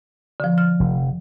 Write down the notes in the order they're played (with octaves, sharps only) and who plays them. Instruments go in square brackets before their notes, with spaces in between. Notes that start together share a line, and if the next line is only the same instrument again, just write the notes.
[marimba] D3 F3
F6
[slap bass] F1